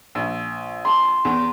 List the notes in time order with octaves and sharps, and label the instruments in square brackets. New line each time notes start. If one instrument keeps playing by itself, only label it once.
[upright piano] A#1
[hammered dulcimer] A5 C6
[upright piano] E2